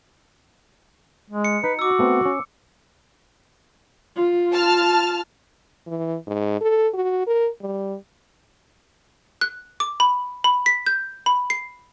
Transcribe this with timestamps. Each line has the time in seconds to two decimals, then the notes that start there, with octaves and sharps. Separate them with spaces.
1.30 G#3
1.44 C#7
1.64 D#4 B4
1.79 F#4 D6 E6
1.99 A3 B3 C4
2.25 C#4
4.16 F4
4.52 A5 F6
5.87 E3
6.27 G#2
6.61 A4
6.94 F#4
7.27 A#4
7.61 G3
9.41 F#6
9.80 D6
10.00 B5
10.44 B5
10.66 B6
10.86 G6
11.26 B5
11.50 C7